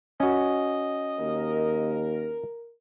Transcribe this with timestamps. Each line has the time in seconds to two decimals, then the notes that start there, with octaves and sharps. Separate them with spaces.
0.20 C#4 F#4 D#5
1.19 D#2 A#4